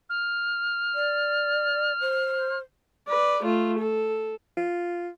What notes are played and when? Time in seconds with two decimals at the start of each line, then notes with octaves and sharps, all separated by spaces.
0.10 F6
0.94 D5
2.00 C5
3.08 B4 D5
3.43 A3 F4
3.79 A4
4.57 F4